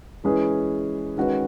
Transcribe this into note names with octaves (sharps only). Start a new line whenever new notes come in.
E3 G#3 C#4 G#4 B4
D#3 G#3 C#4 F#4 B4